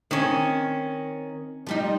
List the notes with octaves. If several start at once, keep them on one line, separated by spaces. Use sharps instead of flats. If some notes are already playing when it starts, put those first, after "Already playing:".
D#3 C4 C#4
F3 G3 D#4